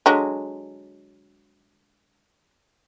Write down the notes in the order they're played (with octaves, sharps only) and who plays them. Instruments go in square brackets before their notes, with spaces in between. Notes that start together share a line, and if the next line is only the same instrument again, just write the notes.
[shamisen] D3 F#3 G#3